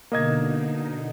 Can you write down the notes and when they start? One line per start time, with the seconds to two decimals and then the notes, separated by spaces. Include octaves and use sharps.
0.12 B2 D3 A#3 D#4 D#5 G#6